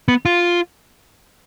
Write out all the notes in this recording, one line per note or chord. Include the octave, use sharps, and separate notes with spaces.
B3
F4